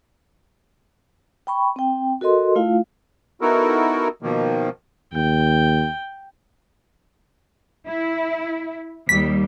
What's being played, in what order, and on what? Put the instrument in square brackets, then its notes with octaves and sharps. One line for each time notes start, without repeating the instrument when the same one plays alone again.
[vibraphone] G5 B5 C#6
C4 G5
F#4 A4 A#4 D#5 C6
A3 E4 F4 F5
[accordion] B3 D#4 E4 F#4 A4 A#4
B2 D#3 F3 A#3
[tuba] D#2 [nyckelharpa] G5
[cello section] E4
[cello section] D#2 G3 [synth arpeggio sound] B6